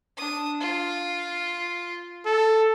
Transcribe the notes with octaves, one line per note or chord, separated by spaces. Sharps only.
D4 D#6
F4
A4